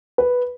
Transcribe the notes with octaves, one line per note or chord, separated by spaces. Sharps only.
B4